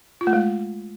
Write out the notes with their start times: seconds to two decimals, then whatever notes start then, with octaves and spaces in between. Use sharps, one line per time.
0.21 F4
0.27 A3
0.33 G#3